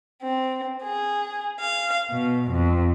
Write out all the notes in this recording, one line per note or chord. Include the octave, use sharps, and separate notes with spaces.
C4
G#4
F5
B2
F2